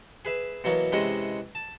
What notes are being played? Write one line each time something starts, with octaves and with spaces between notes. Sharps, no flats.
G#4 B4 E5
B2 E3 F#3 A#3 B3
C3 E3 G#3 C#4 D#5 F#5
A5